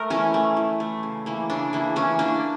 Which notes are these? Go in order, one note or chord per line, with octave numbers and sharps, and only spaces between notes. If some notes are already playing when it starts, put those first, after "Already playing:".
Already playing: A3 A#4
E3 C#4
A3
E3
A3
C#3
E3 A#3
C#3 D4
E3 A#3
E3 C#4
A#3 D4